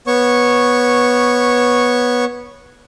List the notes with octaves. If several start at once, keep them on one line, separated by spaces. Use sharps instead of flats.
B3 C#5 C#6